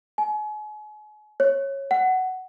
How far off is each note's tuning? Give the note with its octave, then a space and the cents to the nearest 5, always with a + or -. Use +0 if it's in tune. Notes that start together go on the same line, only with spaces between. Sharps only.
G#5 +35
C#5 -15
F#5 +10